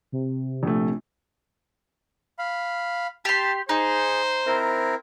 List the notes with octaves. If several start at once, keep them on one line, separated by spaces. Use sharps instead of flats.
C3
A#1 A3
F5 B5
G4 A5 C6
D#4 G#4 C5
C4 E4 A#4